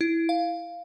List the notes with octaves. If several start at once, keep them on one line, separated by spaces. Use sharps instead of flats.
E4
F5